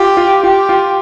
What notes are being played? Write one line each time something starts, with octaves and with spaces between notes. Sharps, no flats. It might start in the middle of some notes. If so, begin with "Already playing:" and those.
Already playing: F4 G4
F4
F4 G4
F4